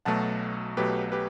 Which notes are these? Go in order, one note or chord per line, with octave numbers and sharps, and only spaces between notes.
B1 B2 F#3 A3 F#5 A5
B1 B2 F#3 A3 G4 B4
G4 B4